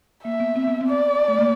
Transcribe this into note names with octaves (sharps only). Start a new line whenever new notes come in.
A#3 E5
B3
C4
B3
C4
D5
A3
A#3